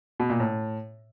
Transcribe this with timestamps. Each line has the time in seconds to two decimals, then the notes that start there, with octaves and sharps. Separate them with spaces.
0.20 B2
0.30 A#2
0.40 A2